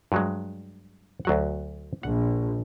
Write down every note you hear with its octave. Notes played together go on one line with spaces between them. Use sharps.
G2 F#3 G#3
D2 F#3 F#5
A#1 F#5